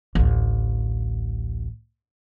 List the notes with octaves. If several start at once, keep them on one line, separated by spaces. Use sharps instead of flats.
A1 D2